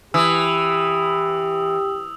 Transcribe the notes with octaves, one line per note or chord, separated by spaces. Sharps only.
E3 G4 D#6 E6